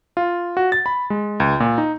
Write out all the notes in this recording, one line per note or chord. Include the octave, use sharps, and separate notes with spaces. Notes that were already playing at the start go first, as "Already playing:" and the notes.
F4
F#4
A6
B5
G#3
C#2
A#2
D#4